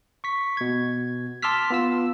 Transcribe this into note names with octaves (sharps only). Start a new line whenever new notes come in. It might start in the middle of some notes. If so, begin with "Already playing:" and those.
C#6 B6
B2 G#6
A5 C6 D6 E6 F6 B6
B3 F4 E6